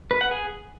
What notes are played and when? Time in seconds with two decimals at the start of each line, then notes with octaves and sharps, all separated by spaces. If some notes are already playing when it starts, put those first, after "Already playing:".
0.11 B4
0.21 F#5
0.31 G#4